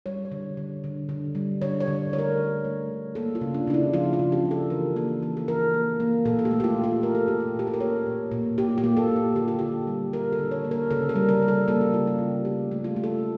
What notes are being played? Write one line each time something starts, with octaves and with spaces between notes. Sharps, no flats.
G3 C#5
C#5
D3
D3
D3
D3
G3
D3 C#5
C#5
D3
A3 C#5
A#4
A3
A3
D3
A#3 A4
F4
C#3
D4
C#3 D4
E4
F3 F4
F4
C#3
G4
C#3
A4
E3 A#4
A#3 A4
E3 A4
A4
E3 A#4
A#3
A#3
A#2 A4
A4
G4
A3
G4
F4
A#2
A4
A3 A#4
A4
A#2 G4
A4
A#2 G4
A4
A#4
A#3 C#5
A#2
A#2
A#2 G4
G4
A#3
A4
A#2
F4
D3 G4
A4
D3 G4
G3
D3 A#4
A4
D3
C#5
A#3
A#4
C#3 A4
A#4
G3
A#4
G3
A4
A#3 A4
G4
C#3 F4
G4
C#3
A3 G4
A3
F4
A3
A4